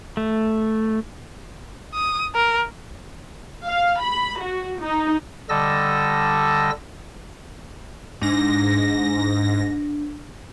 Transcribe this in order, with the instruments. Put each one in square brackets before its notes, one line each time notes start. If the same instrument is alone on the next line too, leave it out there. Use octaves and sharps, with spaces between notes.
[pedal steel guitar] A3
[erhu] D#6
A#4
[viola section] F5
B5
F#4
D#4
[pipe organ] D3 G3 A4 D#5 E6 A#6
[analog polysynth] G#2 A#6 [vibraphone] D4